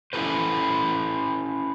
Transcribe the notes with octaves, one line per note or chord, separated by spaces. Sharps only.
C#4 E4 G4 A4 B4 C5